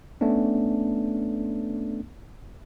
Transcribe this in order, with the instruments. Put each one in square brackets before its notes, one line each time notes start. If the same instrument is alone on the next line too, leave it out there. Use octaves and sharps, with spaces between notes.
[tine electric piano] A3 B3 C#4 D4